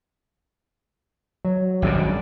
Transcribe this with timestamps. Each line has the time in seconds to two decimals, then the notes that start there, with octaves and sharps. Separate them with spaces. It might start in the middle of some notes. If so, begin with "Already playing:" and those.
1.45 F#3
1.82 G#1 F#2 B2 G3 D4 D5